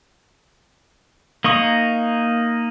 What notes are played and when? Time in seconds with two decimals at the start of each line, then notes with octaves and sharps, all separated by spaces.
1.44 A#3 D#4 C#6 D#6